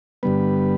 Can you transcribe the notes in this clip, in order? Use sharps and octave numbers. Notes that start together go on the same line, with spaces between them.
G2 D3 G3 B3 B4